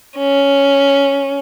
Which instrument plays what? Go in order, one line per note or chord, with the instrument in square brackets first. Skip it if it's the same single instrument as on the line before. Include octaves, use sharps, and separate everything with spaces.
[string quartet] C#4